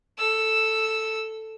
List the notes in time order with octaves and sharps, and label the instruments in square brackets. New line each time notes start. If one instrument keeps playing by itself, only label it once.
[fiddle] A4 E6